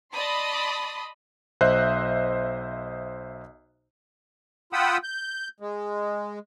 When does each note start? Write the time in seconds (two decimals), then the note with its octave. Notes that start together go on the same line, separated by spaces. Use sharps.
0.12 D5 D#5 A5 B5 C6 D#6
1.61 B1 C5 D#5 E5 F#6
4.73 F4 F#5 G5 B5 D#6 E6
5.03 G6
5.60 G#3